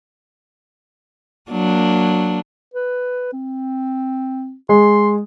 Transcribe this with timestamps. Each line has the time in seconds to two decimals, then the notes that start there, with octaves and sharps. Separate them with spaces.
1.51 F#3 A#3 D4
2.74 B4
3.33 C4
4.69 G#3 C6